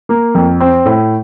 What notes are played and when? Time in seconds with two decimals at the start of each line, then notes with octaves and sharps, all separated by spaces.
0.09 A#3
0.35 F2
0.60 C4
0.86 A2